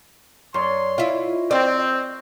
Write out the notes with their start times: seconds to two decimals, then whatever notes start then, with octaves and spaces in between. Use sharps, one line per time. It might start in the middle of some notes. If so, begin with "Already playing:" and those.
0.54 F#2 C#5 D5 C6 D#6
0.98 E4 F4 D#5
1.51 C4 A#4 D5